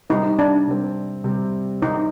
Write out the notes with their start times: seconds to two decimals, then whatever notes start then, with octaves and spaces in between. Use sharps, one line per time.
0.10 C3 G3 C4 D#4
0.39 D4
0.67 C3 G3 C4
1.24 C3 G3 C4
1.82 C3 G3 C4 D#4